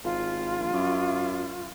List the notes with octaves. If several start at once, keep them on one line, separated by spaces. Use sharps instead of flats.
G#1 F4
A#1
F#2